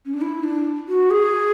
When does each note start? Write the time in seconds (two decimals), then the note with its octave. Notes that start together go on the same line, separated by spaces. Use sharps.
0.05 C#4
0.14 D4
0.21 E4
0.44 D4
0.88 F#4
1.10 G#4